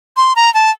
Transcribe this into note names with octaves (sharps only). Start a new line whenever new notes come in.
C6
A#5
A5